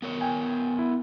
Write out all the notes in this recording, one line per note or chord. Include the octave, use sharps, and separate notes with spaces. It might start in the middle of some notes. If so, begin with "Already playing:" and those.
B3 A#4 C#5
G5 G#5
E4